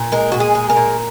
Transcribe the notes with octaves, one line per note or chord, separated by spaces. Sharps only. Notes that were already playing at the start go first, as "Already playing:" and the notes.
Already playing: A#2
G#3 A#4
A#2 F#4
G#4
G#3
A#4
A#2